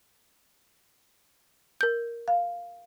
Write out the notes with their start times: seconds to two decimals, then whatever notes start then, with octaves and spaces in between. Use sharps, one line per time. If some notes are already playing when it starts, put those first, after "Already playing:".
1.81 A#4 G6
2.28 F5